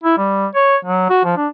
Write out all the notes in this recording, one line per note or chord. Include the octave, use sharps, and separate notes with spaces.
E4
G3
C#5
F#3
F#4
F3
D4